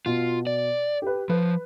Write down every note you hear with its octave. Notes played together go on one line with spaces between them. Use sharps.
B2 F4
D5
G4 B4
F3 B4